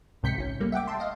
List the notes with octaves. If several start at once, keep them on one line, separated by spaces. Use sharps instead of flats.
C#2 G#2 C3 G6 B6 C#7
G#1 C#4
G3 A3 A#3
E5 F#5 G5 D6
E5 A5 C6
D#5 F5